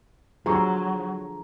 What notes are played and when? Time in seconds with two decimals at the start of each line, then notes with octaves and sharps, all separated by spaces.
0.46 D3 F3 F#3 G#3 A#5 C#6